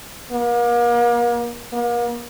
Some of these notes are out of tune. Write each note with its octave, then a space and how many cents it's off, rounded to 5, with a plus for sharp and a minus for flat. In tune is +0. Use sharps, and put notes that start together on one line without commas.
A#3 +40
A#3 +40